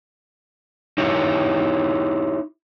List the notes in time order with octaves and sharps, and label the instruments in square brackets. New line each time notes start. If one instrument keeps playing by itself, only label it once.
[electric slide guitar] D#4 E4 G4 C#5